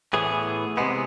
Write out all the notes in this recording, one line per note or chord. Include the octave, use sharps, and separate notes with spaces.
A2 E3 B3 G#4
C3 G#3 B3